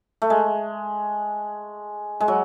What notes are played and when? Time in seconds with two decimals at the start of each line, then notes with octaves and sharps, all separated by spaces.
0.22 A3
0.30 G#3
2.20 G#3
2.28 F#3